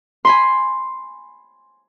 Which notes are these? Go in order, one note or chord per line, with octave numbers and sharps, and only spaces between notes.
G#5 B5 C6